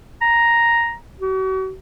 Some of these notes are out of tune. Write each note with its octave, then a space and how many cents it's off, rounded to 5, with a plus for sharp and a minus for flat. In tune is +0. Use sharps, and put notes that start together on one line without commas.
A#5 +5
F#4 +40